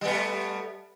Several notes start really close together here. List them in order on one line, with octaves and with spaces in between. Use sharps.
G3 B3 A3